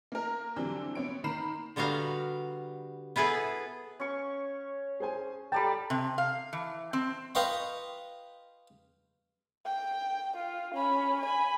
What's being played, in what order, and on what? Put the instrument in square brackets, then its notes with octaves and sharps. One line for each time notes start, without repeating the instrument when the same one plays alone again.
[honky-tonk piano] A#3 A#4
D3 E3 F#3 G3 C4 D4
B3 C4 C#5 D7
D#3 A#3 A#5 B5 C7 E7
[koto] D3 G3 B3 F#4 F5 A#5
B3 E4 G#4 A4 B4
[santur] C#4 C#6 [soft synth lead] C#5
[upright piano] G#4 C5 G#5
[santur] G3 D5 A5 [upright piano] A4 A#5 [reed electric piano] G5
[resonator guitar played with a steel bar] C3
F5
E3
C4
[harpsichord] F4 B4 D#5 G5 C6 C#6
[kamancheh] G5
F4
C#4 B5
G#5 B5